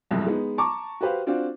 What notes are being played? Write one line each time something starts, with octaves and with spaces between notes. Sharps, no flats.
F#1 C2 F2 G#2
G#3 B3 D#4
A5 A#5 C#6 D6
F#4 G4 B4 C5 F5
C4 D4 F4 F#4